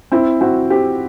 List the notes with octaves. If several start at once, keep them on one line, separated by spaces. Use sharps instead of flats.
C4 E4
C4 F#4
C4 G4